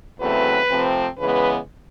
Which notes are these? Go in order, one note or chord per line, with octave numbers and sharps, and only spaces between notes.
E2 C#3 F#3 A3 C4 B4
C3 F3 A3 C4
C#3 E3 G#3 B3 B4